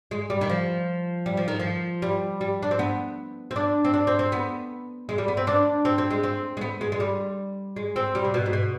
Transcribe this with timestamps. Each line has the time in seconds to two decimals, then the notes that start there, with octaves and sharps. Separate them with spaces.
0.11 G#3
0.30 G3
0.41 D#3
0.49 F3
1.26 G3
1.37 F3
1.48 D#3
1.60 F3
2.02 G3
2.41 G3
2.63 D4
2.71 C4
2.79 B3
3.51 C4
3.56 D4
3.85 C4
3.94 D4
4.07 C4
4.19 C4
4.32 B3
5.09 G#3
5.18 G3
5.28 B3
5.37 C4
5.47 D4
5.85 C4
5.98 C4
6.11 G#3
6.23 C4
6.57 G#3
6.61 B3
6.81 G#3
6.92 G#3
7.00 G3
7.76 G#3
7.96 C4
8.15 G3
8.24 C3
8.34 B2
8.46 G#2
8.53 B2